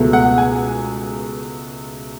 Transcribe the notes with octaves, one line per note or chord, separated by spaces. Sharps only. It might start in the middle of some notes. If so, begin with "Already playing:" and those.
Already playing: C#2 B2 A3
F#5
G#5